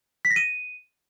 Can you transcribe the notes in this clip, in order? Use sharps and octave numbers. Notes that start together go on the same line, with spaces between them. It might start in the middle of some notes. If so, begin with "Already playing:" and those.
B6
A#6
D#7